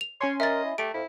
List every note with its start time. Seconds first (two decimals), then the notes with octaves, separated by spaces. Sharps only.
0.01 F7
0.21 C#4 C#5 G#5 C6
0.40 A#4 D#5 E5 A6
0.64 E4
0.78 A3 G4 D7
0.94 F2 E4